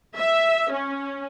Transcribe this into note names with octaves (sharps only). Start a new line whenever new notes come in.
E5
C#4